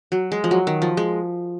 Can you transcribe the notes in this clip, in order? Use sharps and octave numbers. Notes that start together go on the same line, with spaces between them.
F#3
G#3
F3
F#3
D#3
F3
G#3